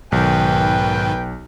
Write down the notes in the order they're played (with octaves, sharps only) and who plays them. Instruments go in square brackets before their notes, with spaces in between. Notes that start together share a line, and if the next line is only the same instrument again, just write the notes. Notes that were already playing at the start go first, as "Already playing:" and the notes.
[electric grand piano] B1 [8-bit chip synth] G#2 D#3 [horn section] B4 G5